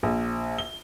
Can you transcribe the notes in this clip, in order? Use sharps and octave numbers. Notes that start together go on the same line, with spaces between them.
A#1
G7